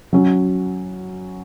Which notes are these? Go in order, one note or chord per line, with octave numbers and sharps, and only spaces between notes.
F#3 C#4 F#4